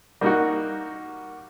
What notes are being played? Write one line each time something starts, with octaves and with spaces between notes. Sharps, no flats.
G3 A#3 D#4 F#4